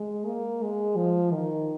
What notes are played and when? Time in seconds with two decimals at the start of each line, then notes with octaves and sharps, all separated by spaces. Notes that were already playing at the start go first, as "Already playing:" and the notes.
Already playing: G#3
0.26 A#3
0.62 G#3
0.96 F3
1.32 D#3